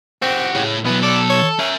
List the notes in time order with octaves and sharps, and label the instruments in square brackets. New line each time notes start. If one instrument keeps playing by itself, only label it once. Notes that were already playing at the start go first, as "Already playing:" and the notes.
[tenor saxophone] C4 [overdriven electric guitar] F#4 G4
[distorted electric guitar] A2 [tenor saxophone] C#3
[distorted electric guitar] B2 F#3 [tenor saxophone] E3 [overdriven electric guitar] B3
[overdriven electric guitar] A4 [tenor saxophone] D5
[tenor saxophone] C#5
[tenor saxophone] C#4 [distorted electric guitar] A#4 E5